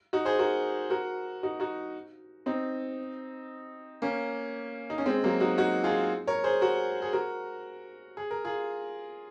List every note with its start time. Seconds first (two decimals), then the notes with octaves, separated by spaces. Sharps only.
0.13 D#4 F#4
0.25 G#4 C5
0.39 F#4 A#4
0.90 F#4 A#4
1.43 D#4 F#4
1.60 D#4 F#4
2.46 C4 D#4
4.02 A#3 C#4
4.90 D#4
4.98 C#4
5.06 G#3 C4
5.24 F#3 A#3
5.40 D#4 F#4
5.58 D#4 F#4
5.84 F4 G#4
6.27 A#4 C#5
6.44 G#4 C5
6.61 F#4 A#4
7.02 G#4
7.13 F#4 A#4
8.17 G#4
8.31 A#4
8.45 F4 G#4